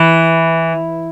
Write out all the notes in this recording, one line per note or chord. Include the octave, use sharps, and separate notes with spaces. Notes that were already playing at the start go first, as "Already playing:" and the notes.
Already playing: E3